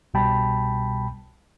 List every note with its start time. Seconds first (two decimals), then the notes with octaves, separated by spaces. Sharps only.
0.14 C2 B2 G3 G5 A5 B5